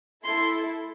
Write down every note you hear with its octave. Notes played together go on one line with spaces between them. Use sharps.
A3 E4 A4 C6